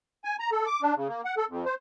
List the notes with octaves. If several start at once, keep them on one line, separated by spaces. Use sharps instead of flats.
G#5
A#5
A4
D6
D4
C#3
A#3
F#5
A4
F2
C5